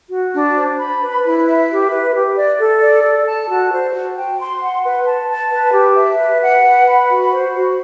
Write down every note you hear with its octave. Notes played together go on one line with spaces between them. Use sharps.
F#4
D4
C5
B5
B4
E4
E5
G4
B4
G4
D5
A4
D5
A4
A5
F#4
C5
F#4
G5
C6
F#5
B4
A5
A5
B4
G4
E5
B4
F#5
B4
B5
F#4
C5
F#4